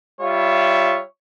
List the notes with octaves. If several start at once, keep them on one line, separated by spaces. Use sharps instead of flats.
G3 F4 C#5 E5